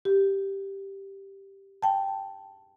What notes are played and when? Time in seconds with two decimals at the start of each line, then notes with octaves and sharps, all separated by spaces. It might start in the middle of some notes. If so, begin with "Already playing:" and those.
0.05 G4
1.82 G5 A5